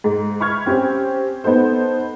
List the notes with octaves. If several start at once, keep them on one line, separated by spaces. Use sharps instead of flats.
G#2
B5 C#6 F6 G#6
C4 C#4 G4 C5
B3 D#4 A4 C5